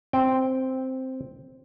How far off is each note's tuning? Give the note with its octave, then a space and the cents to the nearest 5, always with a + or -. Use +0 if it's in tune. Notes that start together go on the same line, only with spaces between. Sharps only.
C4 +0 G5 +0